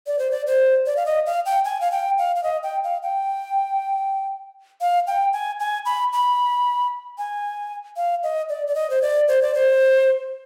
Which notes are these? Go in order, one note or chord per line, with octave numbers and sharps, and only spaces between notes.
D5
C5
D5
C5
D5
F5
D#5
F5
G5
G#5
F5
G5
F5
F5
D#5
G5
F5
G5
F5
G5
G#5
G#5
B5
B5
G#5
F5
D#5
D5
D5
D#5
C5
D5
C5
D5
C5